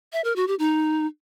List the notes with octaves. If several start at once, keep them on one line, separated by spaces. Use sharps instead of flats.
E5
A#4
F#4
G4
D#4